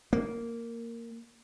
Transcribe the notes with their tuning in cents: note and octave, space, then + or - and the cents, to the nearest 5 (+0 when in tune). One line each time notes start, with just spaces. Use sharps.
A#3 -10